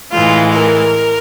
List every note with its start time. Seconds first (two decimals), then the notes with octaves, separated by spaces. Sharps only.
0.12 A2 E3 G#3 F4
0.53 A#4